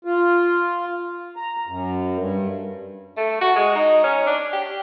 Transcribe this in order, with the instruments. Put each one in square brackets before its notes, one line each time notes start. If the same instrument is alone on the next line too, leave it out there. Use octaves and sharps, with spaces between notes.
[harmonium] F4
A#5
F#2
G2
[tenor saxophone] A3
F#4
G#3
D#4
C#4
D4
G4